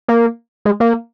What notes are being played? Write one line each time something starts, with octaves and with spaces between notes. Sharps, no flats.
A#3
G#3
A#3